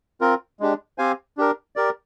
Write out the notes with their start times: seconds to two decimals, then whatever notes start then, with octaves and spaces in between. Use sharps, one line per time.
0.21 C4 F4 A#4
0.60 G#3 D4 G4
0.98 C4 G4 C5 F5 G#5
1.37 D4 G4 A#4
1.76 G4 A#4 D5